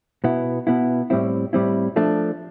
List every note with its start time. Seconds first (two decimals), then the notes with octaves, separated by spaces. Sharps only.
0.24 B2 B3 E4
0.67 B2 B3 E4
1.10 A2 G3 C4 E4
1.53 A2 G3 C4 E4
1.96 F3 A3 D4